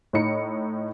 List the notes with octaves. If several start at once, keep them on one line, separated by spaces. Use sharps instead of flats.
A2 D#4 C#7